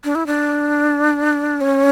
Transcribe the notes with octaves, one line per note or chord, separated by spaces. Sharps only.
D4
E4
D4
C#4